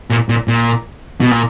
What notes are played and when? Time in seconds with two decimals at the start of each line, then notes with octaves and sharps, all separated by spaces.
0.10 A#2
0.29 A#2
0.48 A#2
1.21 B2
1.31 A#2